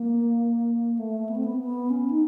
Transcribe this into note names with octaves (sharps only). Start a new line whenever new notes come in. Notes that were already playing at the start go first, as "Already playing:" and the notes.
Already playing: A#3
A3
B3
C4
B3
B3
C#4
D#4